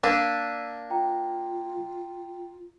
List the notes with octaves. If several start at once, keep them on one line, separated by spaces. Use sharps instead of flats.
A#3 D4 E6 B6 D#7
F4 G5 A#5